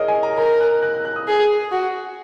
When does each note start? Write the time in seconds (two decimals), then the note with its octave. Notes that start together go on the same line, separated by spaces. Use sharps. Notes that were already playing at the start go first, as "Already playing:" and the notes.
Already playing: G#4 A#4 C#5 D#5
0.08 G#5
0.23 A#5
0.38 A#4 A#5
0.61 F#6
0.83 F#6
0.94 F#6
1.05 F#6
1.16 D#6
1.28 G#4
1.71 F#4